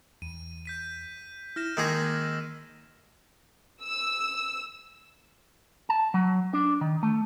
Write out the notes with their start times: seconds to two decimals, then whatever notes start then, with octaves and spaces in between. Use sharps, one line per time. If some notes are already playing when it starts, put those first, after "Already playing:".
0.22 E2 D#7
0.65 G6 B6 D#7
1.56 E4 F6 A#6 E7
1.77 D#3 G#3 A#3 G#4 D6 E6 A#6
3.83 E6
5.89 A5
6.14 F#3
6.54 D4
6.81 D#3
7.03 A3